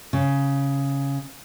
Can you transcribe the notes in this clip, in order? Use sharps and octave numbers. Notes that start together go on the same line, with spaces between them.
C#3